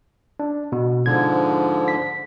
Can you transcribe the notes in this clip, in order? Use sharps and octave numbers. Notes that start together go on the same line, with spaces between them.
D4
B2
G#2 D3 F3 G#6
B6